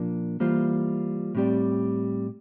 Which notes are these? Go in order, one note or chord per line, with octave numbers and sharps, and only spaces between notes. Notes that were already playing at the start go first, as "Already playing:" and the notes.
Already playing: A#2 F3 A#3 D4
E3 G3 A#3 F4 C5
A2 G3 C4 G4 D5